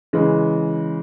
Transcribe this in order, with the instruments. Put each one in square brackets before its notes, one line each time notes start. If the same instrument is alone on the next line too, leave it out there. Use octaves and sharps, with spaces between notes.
[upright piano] C#3 E3 G#3